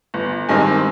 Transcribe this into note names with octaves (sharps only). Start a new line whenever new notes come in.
G1
G2 D#3 G#3 C4 G#5